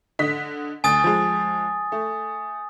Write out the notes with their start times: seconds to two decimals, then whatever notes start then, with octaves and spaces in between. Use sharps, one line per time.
0.19 D3 D#5 B6
0.84 D2 G#5 D#6 A6
1.04 F3 G#3
1.92 A3